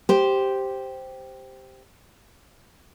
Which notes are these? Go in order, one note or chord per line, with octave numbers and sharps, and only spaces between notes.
G4 C5